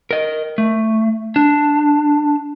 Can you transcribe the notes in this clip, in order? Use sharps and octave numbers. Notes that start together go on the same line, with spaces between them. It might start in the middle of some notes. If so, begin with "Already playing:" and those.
A#4 D#5
A3
D4